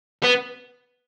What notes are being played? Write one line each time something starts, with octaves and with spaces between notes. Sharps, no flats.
B3